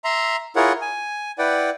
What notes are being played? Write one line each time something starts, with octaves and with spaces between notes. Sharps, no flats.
E5 A#5 C6
E4 F4 G#4 A#4 C#5 F#5
G#5
E4 B4 D5 F#5 G5